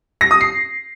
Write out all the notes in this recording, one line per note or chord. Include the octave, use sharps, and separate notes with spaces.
A#6
D#6
C7